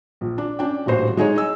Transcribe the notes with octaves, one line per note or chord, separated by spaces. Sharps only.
A#1
D4
C#4 D4 G5
D#1 A1 F#4 C5
G#3 D#4 G#4 C#5
D#5 E6